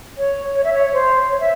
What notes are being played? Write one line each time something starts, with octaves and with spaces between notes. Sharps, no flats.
C#5
C#5
E5
C#5
C5
C#5
E5